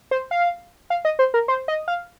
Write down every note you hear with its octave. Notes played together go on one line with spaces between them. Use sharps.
C5
F5
F5
D#5
C5
A#4
C5
D#5
F5